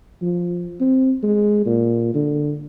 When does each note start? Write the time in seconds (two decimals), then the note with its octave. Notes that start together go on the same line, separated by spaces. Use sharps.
0.22 F3
0.80 C4
1.23 G#3
1.65 A#2
2.14 D3